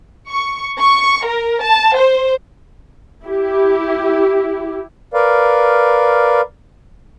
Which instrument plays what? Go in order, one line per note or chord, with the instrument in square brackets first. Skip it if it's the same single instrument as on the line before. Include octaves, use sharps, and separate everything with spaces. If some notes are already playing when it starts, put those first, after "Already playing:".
[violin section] C#6
C#6
A#4
A5
C5
[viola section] E4 G4
[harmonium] A#4 B4 D5 F5